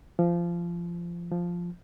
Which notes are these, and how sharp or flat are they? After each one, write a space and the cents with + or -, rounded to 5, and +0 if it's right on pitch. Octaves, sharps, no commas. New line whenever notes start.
F3 -20
F3 +0